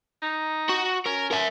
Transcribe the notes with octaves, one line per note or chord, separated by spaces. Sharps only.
D#4
F#4
C#4 A#4
A#4 E5